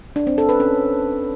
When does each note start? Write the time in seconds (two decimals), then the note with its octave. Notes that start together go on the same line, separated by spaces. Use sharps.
0.16 D4
0.27 C4
0.38 A4
0.49 B4
0.60 C#4